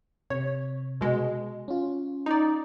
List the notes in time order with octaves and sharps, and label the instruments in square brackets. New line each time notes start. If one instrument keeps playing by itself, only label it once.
[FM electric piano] C3 [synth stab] C#5
[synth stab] B2 G#3
[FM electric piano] C#4 F4
[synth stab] D#4 D5